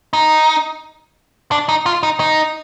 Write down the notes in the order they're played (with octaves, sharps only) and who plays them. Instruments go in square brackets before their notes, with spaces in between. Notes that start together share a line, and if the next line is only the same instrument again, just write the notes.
[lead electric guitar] D#4
D4
D#4
F4
D#4
D#4